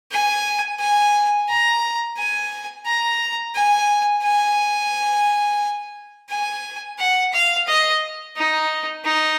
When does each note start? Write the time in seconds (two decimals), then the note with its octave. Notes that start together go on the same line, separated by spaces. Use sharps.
0.12 G#5
0.79 G#5
1.49 A#5
2.17 G#5
2.86 A#5
3.55 G#5
4.23 G#5
6.29 G#5
6.99 F#5
7.33 F5
7.67 D#5
8.36 D#4
9.04 D#4